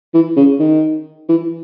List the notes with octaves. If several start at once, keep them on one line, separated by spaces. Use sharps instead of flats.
E3
C#3
D#3
E3